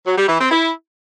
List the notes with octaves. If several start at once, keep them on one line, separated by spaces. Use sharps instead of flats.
F#3
G3
E3
C4
E4